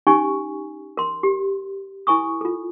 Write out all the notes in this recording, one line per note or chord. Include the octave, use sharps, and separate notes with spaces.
C#4 D#4 G4 G#5 C#6
A#4 C6
G4
E4 A#4 G#5 C#6 D#6
F4 A4